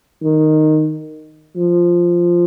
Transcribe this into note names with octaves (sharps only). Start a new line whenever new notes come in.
D#3
F3